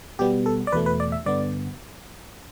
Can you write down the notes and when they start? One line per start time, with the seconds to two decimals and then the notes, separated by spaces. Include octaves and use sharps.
0.19 B2 G3 B3 G4
0.46 A4
0.67 D5
0.72 E2 B2 A3 B4
0.86 B4
1.00 D5
1.12 E5
1.26 G2 D3 B3 D5